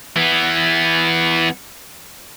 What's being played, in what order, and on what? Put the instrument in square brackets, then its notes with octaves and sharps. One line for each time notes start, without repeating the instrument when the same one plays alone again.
[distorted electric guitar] E3 B3